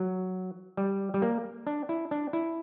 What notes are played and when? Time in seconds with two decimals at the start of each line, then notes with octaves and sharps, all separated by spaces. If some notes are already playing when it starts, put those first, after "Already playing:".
Already playing: F#3
0.77 G3
1.14 G3
1.22 A#3
1.67 D4
1.89 E4
2.11 D4
2.33 E4